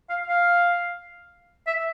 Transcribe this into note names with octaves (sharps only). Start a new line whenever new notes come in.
F5
F5
E5